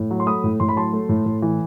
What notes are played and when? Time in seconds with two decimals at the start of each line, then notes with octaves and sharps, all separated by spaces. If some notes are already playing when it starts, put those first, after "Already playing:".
Already playing: A2
0.11 F#3
0.20 C6
0.27 A3 B5 D#6
0.44 A2
0.60 A2 C6
0.69 B5
0.76 F#3 A5 C6
0.93 A3
1.09 A2
1.26 A2
1.42 E3